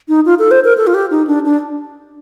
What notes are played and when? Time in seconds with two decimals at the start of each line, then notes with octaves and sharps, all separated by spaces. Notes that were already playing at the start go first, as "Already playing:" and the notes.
0.08 D#4
0.25 F4
0.39 A4
0.51 C5
0.64 A#4
0.77 A4
0.87 F4
0.94 G4
1.11 D#4
1.27 D4
1.45 D4